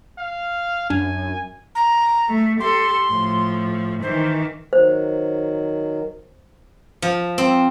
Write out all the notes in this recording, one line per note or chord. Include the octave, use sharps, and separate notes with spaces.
F5
F#2 D4 G#5
A#5
A3
G4 A4 C6
A2 F3
D#3 E3 C5
D#3 F#3 C5
F3
C4